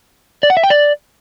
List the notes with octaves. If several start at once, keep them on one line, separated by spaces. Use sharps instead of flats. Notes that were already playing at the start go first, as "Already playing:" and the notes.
D5
F#5
E5
G5
D5